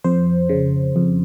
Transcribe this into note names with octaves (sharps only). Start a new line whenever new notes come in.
F2 C5
C#3
F2